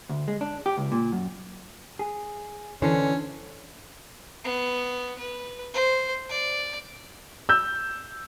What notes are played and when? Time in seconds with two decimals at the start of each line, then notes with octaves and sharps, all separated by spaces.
0.09 D2
0.28 G#3
0.41 D4
0.66 G4
0.78 C#2
0.92 A#2
1.12 F#2
1.99 G#4
2.82 D3 E3 C#4 D4 A4 C5
4.44 B3
5.19 B4
5.74 C5
6.29 D5
7.49 E6 G6